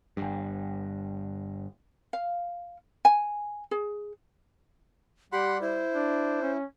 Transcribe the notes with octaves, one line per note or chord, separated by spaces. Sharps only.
G1 G2
F5
G#5
G#4
G3 G4 F#5 B5 C6
E4 C5
D4
C#4